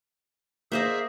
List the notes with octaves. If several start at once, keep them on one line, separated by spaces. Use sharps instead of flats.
A#3 G#4 C5 D#5 E5